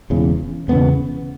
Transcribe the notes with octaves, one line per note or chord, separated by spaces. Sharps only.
E1 E2 C#3
E1 E2 C#3 B3